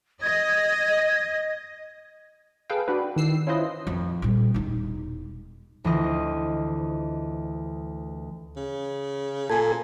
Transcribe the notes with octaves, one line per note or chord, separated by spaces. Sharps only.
D#5 G#6
G#4 A4 B4 F5 G5
D4 F#4 G4 B4
D#3 E3 E6 C7
C#4 E4 F4 B4 C5 D#5
F2
A#2 G3
E1 D#4
D2 E3 F4 C5 D#5
C#3
A#2 A4 G#5